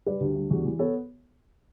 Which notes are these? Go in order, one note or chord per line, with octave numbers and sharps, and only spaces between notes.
G3 B4 D5
D2 G4
G3
E2 F#4
E3
B3 A4 C#5